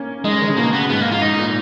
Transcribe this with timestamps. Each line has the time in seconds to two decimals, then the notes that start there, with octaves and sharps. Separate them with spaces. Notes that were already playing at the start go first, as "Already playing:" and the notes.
Already playing: A#3 C#4
0.24 G#3 D#4
0.32 C#4
0.41 D#3
0.49 C#3
0.57 B2 A#3
0.73 B3
0.90 G#2 B3
1.00 A#3
1.11 G#2 F4
1.22 G#2 D#4
1.38 A#2